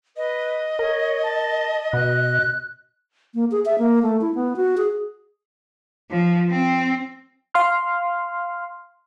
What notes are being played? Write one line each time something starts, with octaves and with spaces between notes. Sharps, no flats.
B4 D#5
A#4 C#5
A5
B2 F#6
A#3
G#4
E5
A#3
A3
E4
B3
F#4
G#4
F3
C4
F5 C6 F6